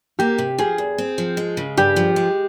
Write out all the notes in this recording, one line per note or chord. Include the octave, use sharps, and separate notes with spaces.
A#3 G4
C3
F3 G#4
E2
C4
F3
G#3
C#3
G2 G4
F3
G#3